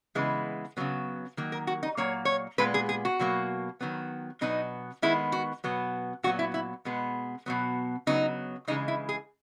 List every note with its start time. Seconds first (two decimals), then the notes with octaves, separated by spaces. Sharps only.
0.15 C#3 E3 G#3 B3
0.77 C#3 F#3 B3
1.37 D#3 F#3 A#3
1.52 A#4
1.67 F#4
1.83 D#4
1.97 A#2 F#3 A#3 C#5
2.25 C#5
2.58 A#2 G#3 B3 B4
2.74 G#4
2.89 G#4
3.05 F#4
3.19 B2 F#3 A#3
3.81 D#3 F#3 B3
4.41 B2 F#3 B3 D#4
5.02 D#3 G#3 B3 E4
5.32 F#4
5.64 B2 F#3 B3
6.23 A#2 F#3 B3 F#4
6.39 E4
6.54 E4
6.85 B2 G#3 B3
7.46 B2 F#3 B3
8.07 C#3 F#3 B3 D#4
8.68 C#3 E3 G#3 D#4
8.88 E4
9.09 G#4